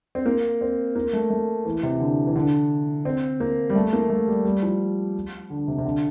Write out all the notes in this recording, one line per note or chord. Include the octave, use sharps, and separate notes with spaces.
C4
A#3
C4
A#3
A3
A3
E3
C3
D3
E3
D3
C4
A#3
G3
A3
A#3
A3
G3
G3
F3
D3
C3
C3
D3